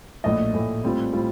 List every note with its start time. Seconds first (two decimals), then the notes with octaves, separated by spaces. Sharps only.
0.24 A#1 A2 A3 D#5
0.54 A#1 A2 A3
0.84 A2 G3 C4 F4
1.13 A2 G3 C4 F4